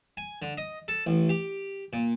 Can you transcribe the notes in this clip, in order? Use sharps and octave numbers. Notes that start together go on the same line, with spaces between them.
G#5
D3
D#5
A4
A1
G4
A#2